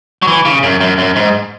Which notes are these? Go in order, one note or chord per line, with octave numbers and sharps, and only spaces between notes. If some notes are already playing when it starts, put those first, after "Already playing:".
F#3
E3
C#3
F#2
F#2
F#2
G#2